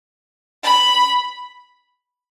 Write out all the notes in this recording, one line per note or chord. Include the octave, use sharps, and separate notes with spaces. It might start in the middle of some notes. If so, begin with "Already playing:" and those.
B5